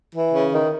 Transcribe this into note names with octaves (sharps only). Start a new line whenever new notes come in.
E3
C#3
D#3